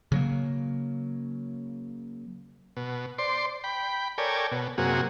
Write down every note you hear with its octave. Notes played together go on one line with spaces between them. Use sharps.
C#3 F#3 A#3
B2
C5 D5 C6
G5 B5
A4 A#4 C#5 D5 G5 G#5
B2
F#2 C3 A#3 F#4 G#4